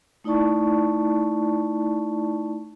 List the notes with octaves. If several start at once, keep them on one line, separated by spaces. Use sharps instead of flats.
A3 D#4 E4 D5 A5 C#6